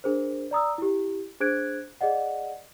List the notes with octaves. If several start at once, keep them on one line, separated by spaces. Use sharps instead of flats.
D4 G#4 A#4 C5
D5 A#5 D#6 E6
E4 G4
D4 G#4 C5 F#6 G#6 D7
G#4 D5 D#5 F#5